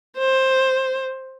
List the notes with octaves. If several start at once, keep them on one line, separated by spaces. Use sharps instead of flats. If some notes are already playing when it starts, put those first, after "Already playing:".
C5